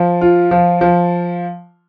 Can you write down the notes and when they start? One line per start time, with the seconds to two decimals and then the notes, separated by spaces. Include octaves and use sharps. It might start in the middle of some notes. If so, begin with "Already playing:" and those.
Already playing: F3
0.21 F4
0.51 F3
0.81 F3